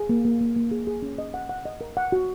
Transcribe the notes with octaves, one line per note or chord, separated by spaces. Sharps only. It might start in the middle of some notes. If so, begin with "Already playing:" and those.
Already playing: G#4
A#3
A#3
A#3
A#3
G#4
G#4
C#4
D#5
F#5
F#5
D#5
A#4
F#5
F#4